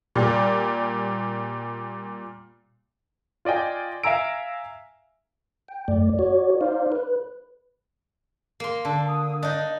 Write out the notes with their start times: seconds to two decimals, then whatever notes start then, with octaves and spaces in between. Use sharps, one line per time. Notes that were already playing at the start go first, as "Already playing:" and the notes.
0.16 A#2 G3
3.45 F4 D5 D#5 G5 G#5
4.04 E5 F5 G#5 A#5 E6 D7
5.68 G5
5.88 F#2 A3 D5
6.19 F#4 C#5 D5
6.61 D#4 C5 D5 F5
6.92 B4
8.60 A#3 C6
8.85 D3 A5
9.08 D#6
9.43 D4 D#4 D#5